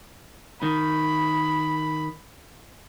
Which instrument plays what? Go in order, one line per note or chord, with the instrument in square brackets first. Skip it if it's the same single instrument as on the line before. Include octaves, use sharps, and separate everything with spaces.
[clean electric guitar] D#3 [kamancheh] B5